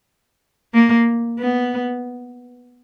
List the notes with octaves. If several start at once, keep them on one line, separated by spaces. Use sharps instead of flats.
A#3
B3